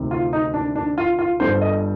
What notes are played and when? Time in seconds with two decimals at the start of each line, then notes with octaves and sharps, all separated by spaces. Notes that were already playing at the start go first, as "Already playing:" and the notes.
Already playing: D2 C3 D#3
0.11 F4
0.33 D#4
0.54 D4
0.76 D4
0.98 F4
1.19 F4
1.40 G1 G2 D3 C5
1.61 D#5